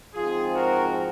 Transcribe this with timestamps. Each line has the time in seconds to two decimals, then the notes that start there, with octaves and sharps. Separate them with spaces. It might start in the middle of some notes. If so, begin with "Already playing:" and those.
0.13 G#2 F3 C4 F4 G#4
0.55 F#4 A#4